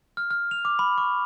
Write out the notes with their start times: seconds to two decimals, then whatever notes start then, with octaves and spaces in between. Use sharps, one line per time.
0.17 F6
0.31 F6
0.51 F7
0.65 D6
0.79 B5
0.98 C#6